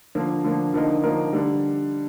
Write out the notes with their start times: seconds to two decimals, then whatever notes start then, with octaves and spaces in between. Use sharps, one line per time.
0.15 D3 F3 A#3
0.44 D3 F3 A#3
0.74 D3 F3 A#3 D#4 A#4
1.03 D3 F3 A#3 D#4 A#4
1.33 D3 G3